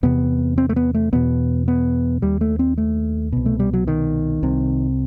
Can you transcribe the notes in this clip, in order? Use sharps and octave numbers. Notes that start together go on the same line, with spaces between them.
E2 C3 B3
C4
A3
B3
A3
E2 B2 B3
B3
D#2 G3
A3
C4
A3
C2 B2
A3
G3
F#3
D#3
C2 C3